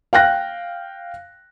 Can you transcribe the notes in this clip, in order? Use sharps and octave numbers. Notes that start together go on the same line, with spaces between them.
F5 G5 F#6 A#6